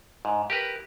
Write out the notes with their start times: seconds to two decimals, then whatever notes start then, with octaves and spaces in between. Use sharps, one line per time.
0.25 G#2
0.50 G4 A#4 B4